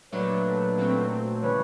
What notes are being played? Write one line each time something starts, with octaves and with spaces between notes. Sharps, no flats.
A#2 F#3 A3 D4 B4 C#5
A#2 F#3 A3 C4
C#3 E3 G3 B4 C#5